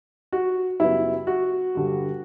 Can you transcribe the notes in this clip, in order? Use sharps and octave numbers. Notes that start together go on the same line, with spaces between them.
F#4
F#2 C#3 G3 B3 E4
F#4
G2 D3 G3